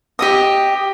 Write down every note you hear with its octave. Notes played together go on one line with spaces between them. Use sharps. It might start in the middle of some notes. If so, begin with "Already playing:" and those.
G4 D#5 D#6